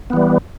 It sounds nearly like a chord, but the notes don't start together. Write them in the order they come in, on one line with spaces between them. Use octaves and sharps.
B3 E3 G3